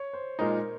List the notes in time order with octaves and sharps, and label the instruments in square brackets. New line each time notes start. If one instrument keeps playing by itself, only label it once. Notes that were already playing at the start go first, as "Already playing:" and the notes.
Already playing: [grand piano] C#5
C5
[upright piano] A#2 G#3 D#4 [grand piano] A#4